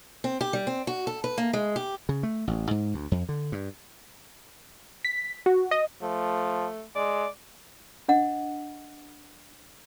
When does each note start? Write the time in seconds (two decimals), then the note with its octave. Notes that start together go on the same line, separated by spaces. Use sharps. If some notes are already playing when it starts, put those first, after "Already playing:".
0.24 C4
0.41 G4
0.53 G3
0.67 C4
0.87 F#4
1.07 A4
1.24 B4
1.38 A#3
1.53 G#3
1.76 G4
2.09 C#3
2.23 A3
2.47 A1
2.71 G#2
2.94 D2
3.11 F2
3.29 D3
3.52 G2
5.05 B6
5.46 F#4
5.71 D#5
6.02 F3 A3
6.96 G#3 D5
8.08 D4 D#5 F#5